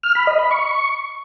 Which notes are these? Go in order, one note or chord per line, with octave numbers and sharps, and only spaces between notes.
F6
B5
D#5
B5
C#6